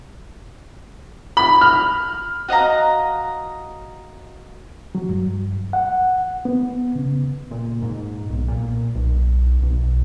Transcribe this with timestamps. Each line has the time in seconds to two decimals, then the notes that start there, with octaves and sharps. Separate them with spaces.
1.37 B5
1.61 F6
2.48 F#4 D#5 F5 A#5
4.95 F#3
5.09 G2
5.73 F#5
6.45 B3
6.95 C#3
7.51 A#2
7.82 G#2
8.30 B1
8.48 A#2
8.95 B1
9.62 B1